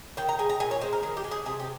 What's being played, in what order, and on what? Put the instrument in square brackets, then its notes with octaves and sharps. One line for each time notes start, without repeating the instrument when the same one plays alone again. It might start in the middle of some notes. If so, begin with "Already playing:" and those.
[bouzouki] D#3 G5
A#5
G#3 G#5
A#5
A#2 G#5
C#5
G#3 C5
A#4
D#3 G#4
G4
G#3
G#4
C3 G#4
G4